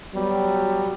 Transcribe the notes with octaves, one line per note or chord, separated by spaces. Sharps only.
F#3 G3 B3